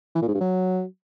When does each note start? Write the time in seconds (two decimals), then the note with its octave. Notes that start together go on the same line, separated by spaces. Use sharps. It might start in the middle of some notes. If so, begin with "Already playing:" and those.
0.15 E3
0.22 A#2
0.28 G#2
0.34 G2
0.41 F#3